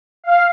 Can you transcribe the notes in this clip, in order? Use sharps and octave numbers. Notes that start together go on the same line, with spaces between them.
F5